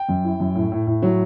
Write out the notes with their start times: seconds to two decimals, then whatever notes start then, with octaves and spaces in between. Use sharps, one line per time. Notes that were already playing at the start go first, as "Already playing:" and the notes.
Already playing: G5
0.09 F#2
0.25 E4
0.40 F#2
0.55 A2
0.72 A2
0.87 A2
1.02 F#3